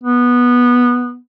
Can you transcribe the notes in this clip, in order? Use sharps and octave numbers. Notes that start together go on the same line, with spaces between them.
B3